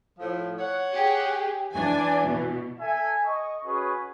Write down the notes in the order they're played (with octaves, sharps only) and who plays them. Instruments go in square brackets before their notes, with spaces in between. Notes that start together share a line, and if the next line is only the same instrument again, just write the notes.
[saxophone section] A2 F3
C#5 F#5
[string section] G4 G#4
[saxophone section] E3 [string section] D4 G#5
[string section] B2
[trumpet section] A4 E5 G#5
D#5 C#6
C#4 F#4 G#4 B4 C#5 G#5